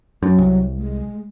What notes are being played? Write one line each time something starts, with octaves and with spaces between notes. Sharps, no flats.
F#2 F#3
C2
G#3